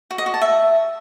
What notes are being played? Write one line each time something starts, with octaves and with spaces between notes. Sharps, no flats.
F#4
D#5
F#4
A5
E5